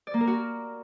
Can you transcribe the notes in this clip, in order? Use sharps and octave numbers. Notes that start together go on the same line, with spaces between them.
D5
A#3
A#4
F#4